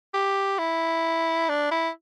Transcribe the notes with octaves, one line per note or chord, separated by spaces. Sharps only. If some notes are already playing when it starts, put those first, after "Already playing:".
G4
E4
D4
E4